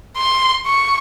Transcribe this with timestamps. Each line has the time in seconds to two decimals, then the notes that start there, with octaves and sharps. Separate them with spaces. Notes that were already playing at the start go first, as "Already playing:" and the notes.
0.18 C6
0.66 C#6